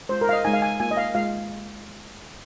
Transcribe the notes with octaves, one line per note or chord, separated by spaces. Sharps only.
G#3 F4 C5
A#4
F5
D#5
G#3 D#4 G#5
F5
G#5
A#3 F4 G#5
D#5
F5
G#3 F4 F5